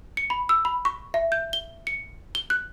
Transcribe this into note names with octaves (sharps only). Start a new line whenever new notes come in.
C#7
B5
E6
B5
C#6
E5
G6
G7
C#7
G7
F#6